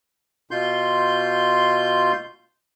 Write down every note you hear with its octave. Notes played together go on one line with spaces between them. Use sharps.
B2 F4 C6 G6